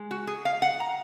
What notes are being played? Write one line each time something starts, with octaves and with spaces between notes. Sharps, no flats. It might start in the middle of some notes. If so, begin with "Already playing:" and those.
Already playing: G#3
F#4
G#4
F5
F#5
A#5